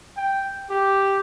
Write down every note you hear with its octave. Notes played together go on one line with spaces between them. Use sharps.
G5
G4